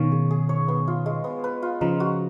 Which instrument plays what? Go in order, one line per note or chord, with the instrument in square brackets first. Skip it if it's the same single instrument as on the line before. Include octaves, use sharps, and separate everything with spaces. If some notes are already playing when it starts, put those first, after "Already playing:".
Already playing: [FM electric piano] B2 D#3 [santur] C#4 F5
[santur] G#4
G#4
C#5
B3
F4
G#3
B3
B4
F4
[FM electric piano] C#3 F3 [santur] D#4
[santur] F#4